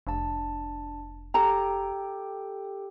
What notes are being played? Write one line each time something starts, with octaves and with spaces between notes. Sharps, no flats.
F1 D4 A5
G4 A4 G5 A#5